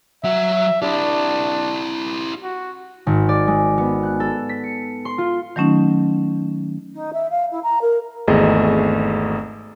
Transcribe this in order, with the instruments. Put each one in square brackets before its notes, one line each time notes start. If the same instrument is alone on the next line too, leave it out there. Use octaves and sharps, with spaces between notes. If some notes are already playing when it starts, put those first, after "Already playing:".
[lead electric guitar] F#3 F#5 [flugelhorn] E5
[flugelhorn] D4 [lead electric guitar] E4 G4
[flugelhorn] F#4
[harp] G#1
D5
G#3
B3
F#6
A4
B6
C#7
C6
F4
[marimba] D#3 F#3 A3 C#4 D#4
[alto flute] D#4
E5
F5
E4
A#5
A#4
[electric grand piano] G#1 E2 A3 C4 G#4 D#5